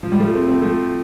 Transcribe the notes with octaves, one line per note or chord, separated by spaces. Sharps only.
F3
G3
F3 A3
A3 C4
A3 C4
F3 A3